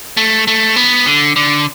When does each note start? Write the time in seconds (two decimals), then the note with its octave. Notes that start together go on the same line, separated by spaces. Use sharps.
0.17 A3
0.47 A3
0.76 B3
1.06 D3
1.36 D3